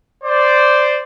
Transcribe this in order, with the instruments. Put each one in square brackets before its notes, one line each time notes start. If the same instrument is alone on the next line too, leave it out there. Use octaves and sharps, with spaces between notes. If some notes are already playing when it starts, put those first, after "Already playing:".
[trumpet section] C5 D5